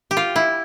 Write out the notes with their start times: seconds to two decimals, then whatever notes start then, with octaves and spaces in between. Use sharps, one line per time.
0.11 G4
0.17 F4
0.36 E4